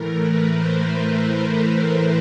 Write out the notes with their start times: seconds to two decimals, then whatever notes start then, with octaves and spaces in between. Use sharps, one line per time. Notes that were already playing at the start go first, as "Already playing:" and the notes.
Already playing: A2 E3 A3 A#4
0.19 B4
0.51 C5
0.83 B4